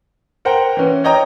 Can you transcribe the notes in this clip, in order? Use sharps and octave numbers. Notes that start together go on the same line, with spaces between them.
A#4 C5 F#5 G5
E3 C#4
C#5 D#5 G5 A#5 D#6